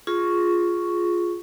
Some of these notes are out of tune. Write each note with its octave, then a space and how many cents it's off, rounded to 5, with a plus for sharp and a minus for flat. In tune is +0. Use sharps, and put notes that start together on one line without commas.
F4 +0 G#4 +0 C#6 +0